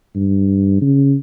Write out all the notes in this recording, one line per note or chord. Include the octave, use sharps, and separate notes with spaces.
G2
C#3